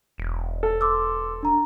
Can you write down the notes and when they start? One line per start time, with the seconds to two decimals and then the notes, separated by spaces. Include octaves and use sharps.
0.18 E1
0.63 A4
0.81 C6 D6 E6
1.43 D4 A#5